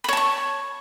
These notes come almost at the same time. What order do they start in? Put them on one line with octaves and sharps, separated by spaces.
B5 C#5 A5 C#6